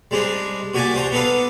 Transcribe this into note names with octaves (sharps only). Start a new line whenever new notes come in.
G3 G#3 C4 D4 D#4
A#2 F#4 G4 G#5 A5 D6
D4 C5 G5 A#5
B3 D4 D#4 A4 B4 F5